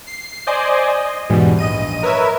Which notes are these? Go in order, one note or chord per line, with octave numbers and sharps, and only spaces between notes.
C7
C5 D5 D#5 G#5
D#5
E2 G#2 B2 E3 G3
A#1 D#5 D#7
A#4 B4 C#5 E5